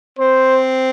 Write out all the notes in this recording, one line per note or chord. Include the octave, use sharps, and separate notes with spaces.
C4 C5